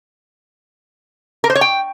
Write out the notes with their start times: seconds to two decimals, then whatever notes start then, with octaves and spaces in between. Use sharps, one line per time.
1.44 A#4
1.50 C5
1.55 C#5
1.61 G5